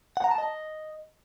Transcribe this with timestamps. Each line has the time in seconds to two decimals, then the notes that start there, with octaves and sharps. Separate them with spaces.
0.17 F#5
0.24 A#5
0.31 A5
0.38 D#5